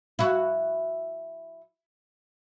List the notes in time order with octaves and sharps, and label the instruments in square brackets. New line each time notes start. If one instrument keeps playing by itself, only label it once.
[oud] E4 F#4